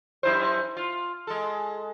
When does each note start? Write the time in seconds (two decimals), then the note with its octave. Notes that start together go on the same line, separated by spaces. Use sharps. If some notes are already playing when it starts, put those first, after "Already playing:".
0.23 F#2 E4 C5
0.77 F4
1.27 G#3 A4